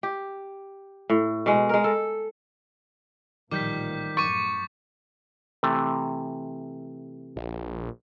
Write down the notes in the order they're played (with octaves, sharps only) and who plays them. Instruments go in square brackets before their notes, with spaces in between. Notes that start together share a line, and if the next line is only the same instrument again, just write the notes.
[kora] G4
A2
B2 G#3
G#3 A#4
A4
[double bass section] A1 A#2 F3 [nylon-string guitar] D#3 G3 [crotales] D6 G6 B6
[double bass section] F#2 A2 [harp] C#6 D#7 [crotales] D6 A6
[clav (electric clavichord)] C3 E3 A3
[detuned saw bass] A#1